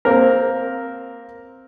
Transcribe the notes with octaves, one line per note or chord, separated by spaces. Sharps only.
A#3 C4 A#4